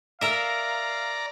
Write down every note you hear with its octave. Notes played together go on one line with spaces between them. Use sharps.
A#4 D5 E5 F5 A#5